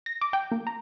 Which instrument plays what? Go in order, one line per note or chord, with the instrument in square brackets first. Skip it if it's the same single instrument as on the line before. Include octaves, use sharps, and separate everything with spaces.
[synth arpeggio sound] A#6
D6
G5
A#3
A#5